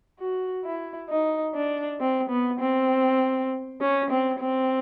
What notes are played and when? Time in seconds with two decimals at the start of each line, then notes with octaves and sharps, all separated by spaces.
0.20 F#4
0.65 E4
1.10 D#4
1.55 D4
2.00 C4
2.30 B3
2.60 C4
3.81 C#4
4.10 C4
4.40 C4